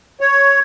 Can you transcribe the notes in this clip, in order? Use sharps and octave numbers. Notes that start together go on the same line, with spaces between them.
C#5